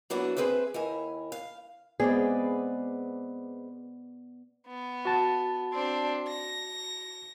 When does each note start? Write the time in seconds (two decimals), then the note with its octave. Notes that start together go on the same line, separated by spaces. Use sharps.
0.10 F#3 A#3 B3 D4 E4 F#4
0.37 C4 G#4 B4 C5 E5
0.74 D#2 E4 A#4 G#5
1.32 F5
2.00 G#3 B3 C4 G#4 B4 D5
4.67 B3
5.05 F#4 A5
5.73 C4 D4
6.28 A#6